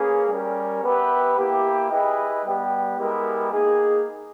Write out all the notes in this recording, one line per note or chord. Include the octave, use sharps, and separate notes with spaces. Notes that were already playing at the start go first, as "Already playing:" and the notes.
Already playing: A#3 C#4 G#4 B4
G3 C#4 G4 A#4
B3 G4 B4 E5 G5
A#3 E4 G4
E4 G#4 B4 D#5 G5
G3 B3 G4
G#3 B3 E4 G4 A#4
A#3 D#4 G#4